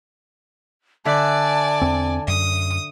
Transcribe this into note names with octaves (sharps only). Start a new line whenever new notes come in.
D3 D5 E5 G#5 A5 F#6
E2 C4
F#2 D#6